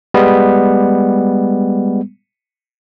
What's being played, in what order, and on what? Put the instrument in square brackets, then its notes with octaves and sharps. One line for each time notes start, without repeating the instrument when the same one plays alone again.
[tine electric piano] G3 G#3 B3